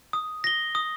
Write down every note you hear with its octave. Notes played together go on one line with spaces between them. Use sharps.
D#6
A#6 G7
D#6